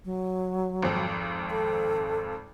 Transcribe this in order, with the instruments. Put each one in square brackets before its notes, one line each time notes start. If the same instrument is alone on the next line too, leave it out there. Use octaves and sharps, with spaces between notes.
[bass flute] F#3
[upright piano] G#1 F2
[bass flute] A4